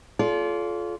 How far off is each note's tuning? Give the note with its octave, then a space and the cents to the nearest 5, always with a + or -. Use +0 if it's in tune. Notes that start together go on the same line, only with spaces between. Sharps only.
F4 +0 A4 -40 D5 -40